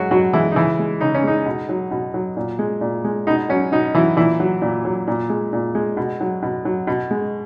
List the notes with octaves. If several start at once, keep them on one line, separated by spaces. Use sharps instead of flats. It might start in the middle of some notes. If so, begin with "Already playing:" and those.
Already playing: F#3 G#3 F#4
B2 F#3 F#4
E3 G#3 E4
D#4
C#3 E3 E4
G#3
C#3 D#4
C#4
G#3 D#4
B2
F#3
B2
F#3
A#2
G#3
A#2
G#3
B2 D#4
F#3 C#4
B2 D#4
E3 F#3 E4
A#2 E3 E4
F#3
A#2
F#3
A#2
G#3
A#2
G#3
B2
F#3
B2
F#3
B2
G#3